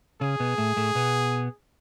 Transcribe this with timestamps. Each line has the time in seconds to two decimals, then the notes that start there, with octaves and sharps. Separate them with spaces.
0.21 C#3 C#4 G#4
0.40 B2 B3
0.58 A2 A3
0.77 A2 A3
0.95 B2 B3